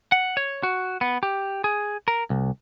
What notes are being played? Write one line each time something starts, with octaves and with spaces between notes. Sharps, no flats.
F#5
C#5
F#4
B3
G4
G#4
A#4
C2